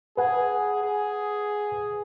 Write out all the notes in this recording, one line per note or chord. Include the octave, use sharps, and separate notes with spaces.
G#4 B4 F#5 G#5
G#4